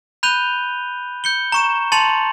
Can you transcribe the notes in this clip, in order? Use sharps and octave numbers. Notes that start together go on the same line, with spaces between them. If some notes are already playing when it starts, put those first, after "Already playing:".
B5 F#6 G6 D#7 F7 G7
G6 C#7 G7
A#5 C#6 E7
A5 C6 A6 C#7 F7 F#7